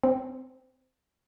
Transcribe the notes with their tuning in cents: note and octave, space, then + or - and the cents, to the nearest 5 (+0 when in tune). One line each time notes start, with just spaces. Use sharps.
C4 -15